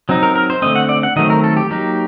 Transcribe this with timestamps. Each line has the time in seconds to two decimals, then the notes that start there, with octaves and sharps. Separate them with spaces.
0.09 F#3 C4 D#4
0.23 A#4
0.35 A#4
0.50 C5
0.62 D3 A3 C4 D#5
0.75 F#5
0.89 D5
1.03 F#5
1.16 D#3 F#3 A3 C4 D#5
1.30 A#4
1.44 A4
1.57 G4
1.70 F#3 A#3 D#4 G4